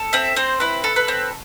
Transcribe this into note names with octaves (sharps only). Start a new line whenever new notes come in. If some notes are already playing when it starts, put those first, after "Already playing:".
Already playing: A4
C4 E5
C4 C5
E4 B4
A4
B4
C4